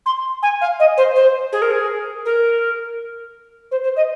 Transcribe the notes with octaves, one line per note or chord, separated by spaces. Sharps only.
C6
G#5
F5
D#5
C5
C5
G#4
A#4
G#4
A#4
C5
C5
D#5